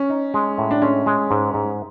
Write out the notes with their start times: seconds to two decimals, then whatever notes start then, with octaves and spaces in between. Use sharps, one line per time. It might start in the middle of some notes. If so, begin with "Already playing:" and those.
Already playing: C#4
0.10 D#4
0.34 G#3
0.58 A2
0.71 D4
0.82 G#3 C#4
1.06 G#3
1.31 G#2
1.54 G#2